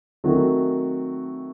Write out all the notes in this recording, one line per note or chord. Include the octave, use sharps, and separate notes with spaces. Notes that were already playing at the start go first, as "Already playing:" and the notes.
D#3 F#3 A3 C4 F#4